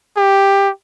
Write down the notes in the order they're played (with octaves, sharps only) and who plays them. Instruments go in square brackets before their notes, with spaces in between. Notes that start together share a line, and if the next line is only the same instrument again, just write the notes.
[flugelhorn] G4